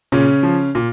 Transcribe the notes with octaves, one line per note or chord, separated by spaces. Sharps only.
A#2 C#3 C#4
F3
A#2